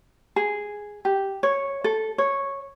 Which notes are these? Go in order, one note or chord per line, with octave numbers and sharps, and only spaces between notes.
G#4
G4
C#5
A4
C#5